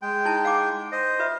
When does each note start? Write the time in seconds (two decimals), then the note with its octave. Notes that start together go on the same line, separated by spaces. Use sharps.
0.02 G#3 G5
0.25 D#4 E4 A5
0.45 F5 F#5 D6
0.92 C5 D#5
1.19 F4 B4 E5